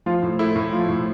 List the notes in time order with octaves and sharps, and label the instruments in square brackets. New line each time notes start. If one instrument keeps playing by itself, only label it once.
[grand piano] F3 F4
A2
A3 E4
A2
F3 F4
A2